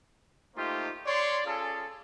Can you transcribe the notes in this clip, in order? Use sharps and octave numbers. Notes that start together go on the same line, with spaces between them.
A3 A#3 D#4 F4 G4 C5
C#5 D5 C6
C#4 F4 G#4 A4